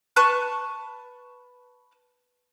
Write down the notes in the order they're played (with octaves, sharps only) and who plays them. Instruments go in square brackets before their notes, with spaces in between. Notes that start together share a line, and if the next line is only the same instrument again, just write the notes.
[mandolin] B4 A5 C#6 F#6